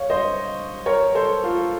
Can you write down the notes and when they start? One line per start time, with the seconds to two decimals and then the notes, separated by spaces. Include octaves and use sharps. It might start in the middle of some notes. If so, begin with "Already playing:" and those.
Already playing: C#5 F5
0.10 C5 D#5
0.86 A#4 C#5
1.15 A4 C5
1.44 F4 A4